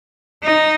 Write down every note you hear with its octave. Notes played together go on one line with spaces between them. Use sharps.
D#4